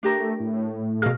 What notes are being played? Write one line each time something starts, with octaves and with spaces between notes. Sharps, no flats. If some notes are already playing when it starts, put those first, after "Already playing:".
A3 D4 G4 A#4
A2
B2 G#4 A#4 F5 F6